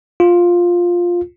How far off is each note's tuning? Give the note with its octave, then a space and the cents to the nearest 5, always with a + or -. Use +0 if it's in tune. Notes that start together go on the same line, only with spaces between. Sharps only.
F4 +5